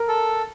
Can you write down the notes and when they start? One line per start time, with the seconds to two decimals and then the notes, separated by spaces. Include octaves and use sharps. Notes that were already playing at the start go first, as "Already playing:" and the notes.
Already playing: A#4
0.08 A4